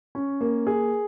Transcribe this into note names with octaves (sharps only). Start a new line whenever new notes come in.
C#4
A#3
G#4